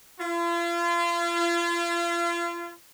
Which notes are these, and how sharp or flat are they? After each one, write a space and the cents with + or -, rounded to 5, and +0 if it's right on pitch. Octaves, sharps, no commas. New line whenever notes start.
F4 -35